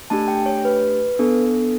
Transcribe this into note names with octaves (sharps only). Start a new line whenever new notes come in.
A3 D4 G4 A5
G5
C#5
B4
B3 D4 A4